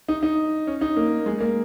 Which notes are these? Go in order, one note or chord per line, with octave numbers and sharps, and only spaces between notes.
D#4
D#4
C#4
D#4
A#3
G#3
A#3